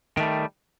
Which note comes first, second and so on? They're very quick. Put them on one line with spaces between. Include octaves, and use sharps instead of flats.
D#3 A3 G3